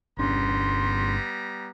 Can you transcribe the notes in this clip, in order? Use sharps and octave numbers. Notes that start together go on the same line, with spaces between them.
G1 G3 B3 C#4 D4 A#5 C6